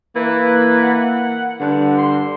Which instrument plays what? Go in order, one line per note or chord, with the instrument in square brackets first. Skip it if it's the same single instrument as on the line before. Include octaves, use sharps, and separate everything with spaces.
[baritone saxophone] E3 [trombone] A#3 [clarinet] B4
[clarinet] F#5
[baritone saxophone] G2 [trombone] D3
[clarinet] C6